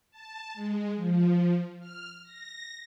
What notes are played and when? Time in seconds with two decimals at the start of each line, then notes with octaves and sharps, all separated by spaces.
0.11 A5
0.54 G#3
0.96 F3
1.80 F6
2.23 A#6